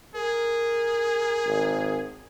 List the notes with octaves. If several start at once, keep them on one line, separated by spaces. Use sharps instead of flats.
G#4 A#4
G#1